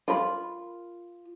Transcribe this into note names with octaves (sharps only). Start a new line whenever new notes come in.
F4 A#4 B5